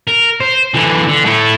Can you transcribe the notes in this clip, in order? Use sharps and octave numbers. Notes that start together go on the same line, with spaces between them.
A#4
C5
D3 E3
D3
A3 E4